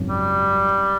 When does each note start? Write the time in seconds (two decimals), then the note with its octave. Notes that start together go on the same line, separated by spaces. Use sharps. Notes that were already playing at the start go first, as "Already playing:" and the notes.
Already playing: G#1 F#2 C#3
0.09 G3